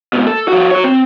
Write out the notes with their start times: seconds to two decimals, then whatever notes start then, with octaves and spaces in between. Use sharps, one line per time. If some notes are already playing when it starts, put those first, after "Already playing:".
0.13 G#2 B2
0.27 A4
0.48 F3 F#4
0.71 F#4 C#5
0.84 C4